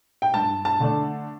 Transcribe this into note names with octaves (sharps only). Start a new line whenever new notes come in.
G5
G2 A5
A5
D3 A3 D4